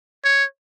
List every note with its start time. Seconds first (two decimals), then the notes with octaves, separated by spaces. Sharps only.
0.25 C#5